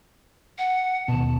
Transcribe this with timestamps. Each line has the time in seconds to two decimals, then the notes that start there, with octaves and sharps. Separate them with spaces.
0.58 F#5
1.08 D#2 B2 A5